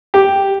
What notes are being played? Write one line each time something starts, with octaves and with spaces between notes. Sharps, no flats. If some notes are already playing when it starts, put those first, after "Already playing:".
G4